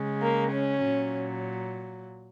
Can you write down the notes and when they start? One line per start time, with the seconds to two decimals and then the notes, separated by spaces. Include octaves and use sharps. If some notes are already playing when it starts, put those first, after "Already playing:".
Already playing: C#3 G#3
0.22 A#3
0.53 C#4
0.82 A#2 F#3